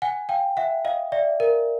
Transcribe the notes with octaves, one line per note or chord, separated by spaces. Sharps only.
F#5 G#5
F5 G5
E5 F#5
D#5 F5
D5 E5
A#4